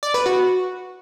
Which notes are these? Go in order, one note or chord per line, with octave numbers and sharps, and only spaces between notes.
D5
B4
F#4